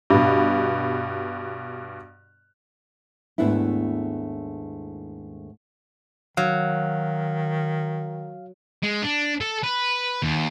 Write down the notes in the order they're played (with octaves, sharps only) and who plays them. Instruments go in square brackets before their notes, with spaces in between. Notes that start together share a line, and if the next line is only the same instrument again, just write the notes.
[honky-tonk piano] G2 B2
[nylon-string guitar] D#2 G#2 A3 B3 D4 E4
[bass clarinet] D#3 [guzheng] F#3 [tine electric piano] F5
[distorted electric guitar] G#3
D4
A4
B4
D#2